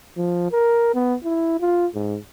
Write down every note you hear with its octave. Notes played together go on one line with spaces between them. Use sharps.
F3
A#4
B3
E4
F4
G#2